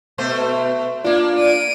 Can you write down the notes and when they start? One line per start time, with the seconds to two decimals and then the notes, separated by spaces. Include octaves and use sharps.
0.18 B2 A3 C5
1.05 A#3 D4 F4 D5
1.38 D7 D#7